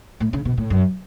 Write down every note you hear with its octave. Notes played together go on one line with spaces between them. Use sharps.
A2
C#3
B2
A2
F#2